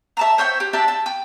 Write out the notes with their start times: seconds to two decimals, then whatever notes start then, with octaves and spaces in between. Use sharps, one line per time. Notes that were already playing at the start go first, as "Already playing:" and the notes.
0.17 E5 A5 A#5
0.38 C5 C#5 E5 G5
0.60 G4
0.73 D4 G4 E5 A5
0.88 A5
1.06 G5